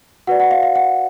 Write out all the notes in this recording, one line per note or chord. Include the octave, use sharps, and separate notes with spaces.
F#4 B4 D5 F#5
F#5
F5
F5
F#5